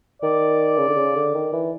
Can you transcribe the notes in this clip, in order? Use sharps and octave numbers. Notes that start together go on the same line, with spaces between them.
D#3 D5
C#3
D3
C#3
D3
D#3
E3